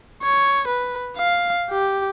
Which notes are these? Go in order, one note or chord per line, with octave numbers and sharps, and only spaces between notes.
C#5
B4
F5
G4